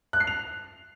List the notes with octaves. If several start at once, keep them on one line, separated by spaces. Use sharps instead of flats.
F#6
C7
F7